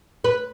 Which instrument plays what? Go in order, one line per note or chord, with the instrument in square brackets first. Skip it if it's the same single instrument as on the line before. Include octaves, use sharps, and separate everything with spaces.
[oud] B4